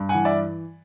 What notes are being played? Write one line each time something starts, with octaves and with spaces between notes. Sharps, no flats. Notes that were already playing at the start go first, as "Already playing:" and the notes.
Already playing: G2
F#5 G#5
E3
D5 E5